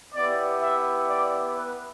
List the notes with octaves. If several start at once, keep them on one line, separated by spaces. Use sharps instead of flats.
B3 E4 G4 D5
E5
D5
B4